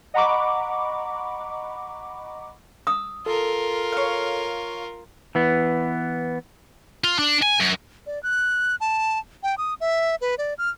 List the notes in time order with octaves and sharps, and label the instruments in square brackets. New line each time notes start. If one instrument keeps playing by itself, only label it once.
[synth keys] D#5 F#5 A#5 B5 C#6 D6
[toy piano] D#6 [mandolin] E6
[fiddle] F4 A#4 [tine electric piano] A4
[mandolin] C#5 F5
[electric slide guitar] E3 B3
[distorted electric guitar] F4
D4
G#5
F#2
[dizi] D5
F#6
A5
G5
D#6
E5
B4
D5
F6